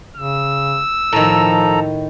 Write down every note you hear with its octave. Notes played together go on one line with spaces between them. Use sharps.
C#3 E6
A2 D#3 F3 A4 A#5